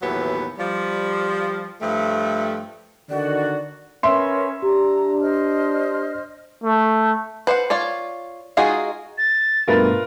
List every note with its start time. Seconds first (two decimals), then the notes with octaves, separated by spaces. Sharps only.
0.02 D#2 A2 E3 F#3 B3
0.58 F3 G3
1.81 G2 F3 A3
3.10 D3 D#3 F#4 D5
4.03 C#4 A#4 B4 E5 C6
4.62 D4 G4 A#5
5.20 C5 D#5 F6
6.63 A3
7.47 B4 C5 F5 F#5
7.70 F4 C#5 D5
8.57 G#3 D#4 F4 F#4 G#4
9.18 A6
9.68 G2 B2 A3 F4 A#4 B4